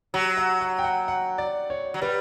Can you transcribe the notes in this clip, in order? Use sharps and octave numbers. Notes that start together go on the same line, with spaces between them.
F#3 A#5
F#5
F#5
G5
F#5
F#5
D5
C#5
F#3
G3 B4